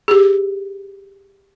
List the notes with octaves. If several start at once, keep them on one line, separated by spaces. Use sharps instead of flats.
G4 G#4